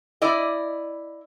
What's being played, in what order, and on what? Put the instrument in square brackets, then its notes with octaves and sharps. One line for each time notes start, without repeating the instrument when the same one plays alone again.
[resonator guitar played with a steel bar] E4 D5 D#5